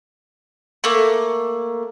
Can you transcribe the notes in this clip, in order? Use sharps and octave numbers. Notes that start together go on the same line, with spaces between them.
A3 A#3